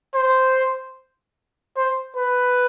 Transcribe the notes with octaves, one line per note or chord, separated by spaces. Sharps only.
C5
C5
B4